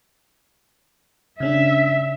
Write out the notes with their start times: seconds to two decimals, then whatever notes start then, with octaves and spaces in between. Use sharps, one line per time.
1.40 C#3 C#4 D4 E5